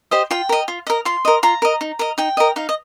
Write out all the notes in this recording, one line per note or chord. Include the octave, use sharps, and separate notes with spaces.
G4 C5 D#5
F4 G5
A#4 D#5
F4
A#4 D#5
F4 C6
A#4 D#5
F4 A#5
A#4 D#5
D#4
A#4 D#5
D#4 G5
A#4 D#5
D#4 F5
D#5